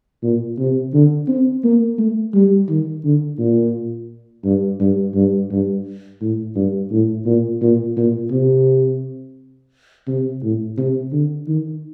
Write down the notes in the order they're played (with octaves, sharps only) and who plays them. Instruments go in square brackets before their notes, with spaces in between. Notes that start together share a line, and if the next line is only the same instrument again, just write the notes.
[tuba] A#2
C3
D3
C4
A#3
A3
G3
D#3
D3
A#2
G2
G2
G2
G2
A2
G2
A2
A#2
A#2
A#2
C3
C3
A2
C3
D3
D#3